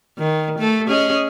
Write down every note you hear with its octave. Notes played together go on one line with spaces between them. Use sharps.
D#3
A3 A4
C#4 G#4 D#5